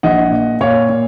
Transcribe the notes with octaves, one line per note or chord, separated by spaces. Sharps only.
A#1 D#5 F#5
A#2
A#2 C#5 F5
A#2